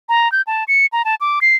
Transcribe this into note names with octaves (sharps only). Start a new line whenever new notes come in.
A#5
G6
A5
C#7
A#5
A5
D6
C7